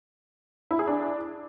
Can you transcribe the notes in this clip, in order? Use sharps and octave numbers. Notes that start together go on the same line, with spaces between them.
E4
G#4
D4